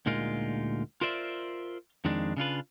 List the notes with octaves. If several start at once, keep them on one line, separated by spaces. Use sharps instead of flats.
D2 A#2 G#3 D#4 F4 A#4
F4 A#4 C5 D5 E5
F2 D#3 G#3 D4
C#3 D4 F4 B4